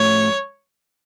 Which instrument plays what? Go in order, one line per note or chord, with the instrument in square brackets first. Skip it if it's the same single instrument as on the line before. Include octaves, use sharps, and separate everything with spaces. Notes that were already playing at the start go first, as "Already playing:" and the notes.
Already playing: [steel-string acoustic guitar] A2 F3 A3 C#4 F#4 [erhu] C#5